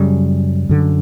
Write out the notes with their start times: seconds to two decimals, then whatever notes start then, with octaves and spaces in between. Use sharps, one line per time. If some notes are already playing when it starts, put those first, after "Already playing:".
Already playing: F#2 C#3 G3
0.69 F#2 D3